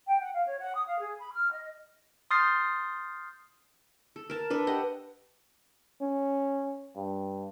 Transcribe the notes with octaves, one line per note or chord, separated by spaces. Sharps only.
G5
F#5
F5
C#5
F#5
D#6
F5
G#4
B5
F6
D#5
C6 D#6 F6 G6 A6 C7
A4
A#4 A5
D4 A4 B4
G4 D#5 F#5
C#4
G2